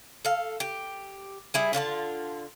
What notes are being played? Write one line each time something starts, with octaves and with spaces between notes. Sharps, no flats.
A4 F5
G4
G3 E4 G#4
D3 F4 C5 A5